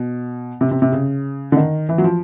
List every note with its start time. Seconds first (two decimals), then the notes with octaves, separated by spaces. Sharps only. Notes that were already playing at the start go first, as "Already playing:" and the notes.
Already playing: B2
0.61 C3
0.71 C3
0.82 C3
0.92 C#3
1.52 D3
1.57 D#3
1.89 E3
1.98 F#3
2.04 F3